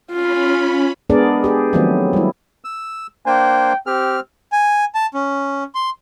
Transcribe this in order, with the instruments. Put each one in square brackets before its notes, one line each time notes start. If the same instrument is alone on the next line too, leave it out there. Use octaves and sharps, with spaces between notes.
[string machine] C#4 B5 [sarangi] F4
[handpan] G#3 B3 D4 G#4 A#4 D5
G4 G#4
D#3 F3 F#3 A3 B3 C4
G3 E4
[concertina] E6
[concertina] A#3 D4 C5 [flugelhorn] G5
[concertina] C4 F6 [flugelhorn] G4
[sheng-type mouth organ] G#5
A5
C#4
C6